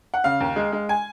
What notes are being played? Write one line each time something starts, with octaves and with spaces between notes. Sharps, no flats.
F#5
C#3 F5
D#2
G#3
G#3
G#5